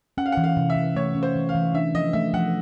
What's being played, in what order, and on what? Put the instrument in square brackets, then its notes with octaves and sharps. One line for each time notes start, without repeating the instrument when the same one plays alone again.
[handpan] C#4 [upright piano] F#5
[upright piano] F5
F#5
[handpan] E3
[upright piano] F5
[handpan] C3
[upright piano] E5
[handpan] C3
[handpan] A3 [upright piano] C#5
[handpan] C#4
[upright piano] C5
[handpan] E3
[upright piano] F5
[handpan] E3
[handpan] D4 [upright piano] E5
[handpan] F3 [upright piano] D#5
[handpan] A3 [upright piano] E5
[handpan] F3 [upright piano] F#5